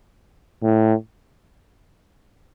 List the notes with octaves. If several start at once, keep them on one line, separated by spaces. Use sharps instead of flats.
A2